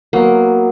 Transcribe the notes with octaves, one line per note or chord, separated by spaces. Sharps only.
F#3 A#3 B3 F#4